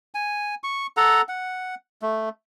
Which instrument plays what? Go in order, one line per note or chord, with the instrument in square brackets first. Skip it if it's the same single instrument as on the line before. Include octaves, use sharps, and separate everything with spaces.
[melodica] G#5
C#6
A4 F#5 A#5
F#5
A3